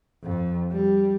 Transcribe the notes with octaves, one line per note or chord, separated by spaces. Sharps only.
F2
G3